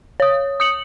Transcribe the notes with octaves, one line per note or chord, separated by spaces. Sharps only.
C#5 D#6
D#6 C#7 F#7